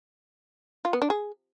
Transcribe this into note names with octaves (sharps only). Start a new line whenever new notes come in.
F4
B3
D4
G#4